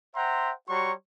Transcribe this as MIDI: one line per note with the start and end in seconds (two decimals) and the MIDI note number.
0.15 0.52 72
0.15 0.52 76
0.15 0.52 78
0.15 0.52 79
0.15 0.52 82
0.15 0.52 84
0.69 0.92 55
0.69 0.92 66
0.69 0.92 73
0.69 0.92 82
0.69 0.92 84
0.69 0.92 85